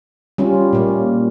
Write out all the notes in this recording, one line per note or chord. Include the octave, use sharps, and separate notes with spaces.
G3 C#4 F4
A#2 A#3